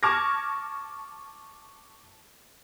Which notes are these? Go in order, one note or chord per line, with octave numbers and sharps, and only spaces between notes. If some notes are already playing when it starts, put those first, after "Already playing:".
A5 C#6 D6 F6 G#6 A#6